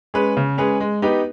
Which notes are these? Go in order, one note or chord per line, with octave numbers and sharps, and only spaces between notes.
G#3 C#4 G#4 B4
C#3
G#3 C#4 G#4 B4
G#3
B3 D#4 G4 B4